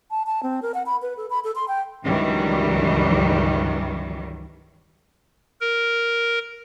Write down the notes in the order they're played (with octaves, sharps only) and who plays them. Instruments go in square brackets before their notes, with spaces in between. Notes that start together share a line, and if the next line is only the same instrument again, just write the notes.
[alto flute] A5
A5
C4
A#4
F#5
B5
B4
A4
B5
A4
C6
G5
[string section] C#2 G2 D#3 E3 F#3 G3
[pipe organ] A#4